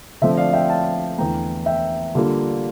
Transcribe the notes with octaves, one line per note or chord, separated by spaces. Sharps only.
D3 F3 A3 C4 E5
D5 F5
E5 G5
F5 A5
E2 D3 A3 G5 A#5
E5 G5
D3 G3 A#3 F4